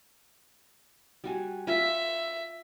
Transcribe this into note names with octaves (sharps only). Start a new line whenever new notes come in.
G3 F#4 G#5
F4 E5